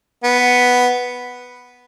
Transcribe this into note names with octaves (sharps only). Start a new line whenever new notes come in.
B3